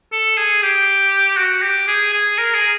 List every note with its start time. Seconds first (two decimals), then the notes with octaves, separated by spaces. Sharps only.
0.12 A4
0.37 G#4
0.62 G4
1.38 F#4
1.63 G4
1.88 G#4
2.13 G#4
2.38 A#4
2.54 G#4